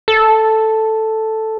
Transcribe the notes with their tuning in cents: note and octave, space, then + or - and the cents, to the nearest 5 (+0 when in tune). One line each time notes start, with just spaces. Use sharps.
A4 +0